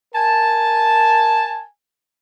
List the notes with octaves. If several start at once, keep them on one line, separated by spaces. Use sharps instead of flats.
A#4 G#5 A5